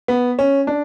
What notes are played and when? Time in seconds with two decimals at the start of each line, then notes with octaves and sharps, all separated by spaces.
0.08 B3
0.39 C#4
0.67 D4